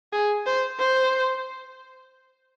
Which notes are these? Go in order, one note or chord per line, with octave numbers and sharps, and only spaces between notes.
G#4
C5
C5